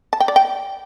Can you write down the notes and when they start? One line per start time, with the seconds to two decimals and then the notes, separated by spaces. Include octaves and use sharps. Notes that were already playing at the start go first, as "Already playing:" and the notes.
0.13 A5
0.20 G5
0.28 D5
0.36 G5